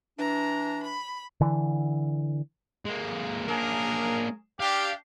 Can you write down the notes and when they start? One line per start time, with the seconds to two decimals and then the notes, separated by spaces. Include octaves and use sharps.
0.19 E3 D4 A#5
0.83 B5
1.41 D3 E3
2.85 G#3 A#3
3.48 A#3 C#4 D4 G#4 A#4
4.60 D4 G4 F5